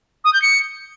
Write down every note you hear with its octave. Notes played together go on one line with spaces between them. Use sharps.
D#6
G6
C#7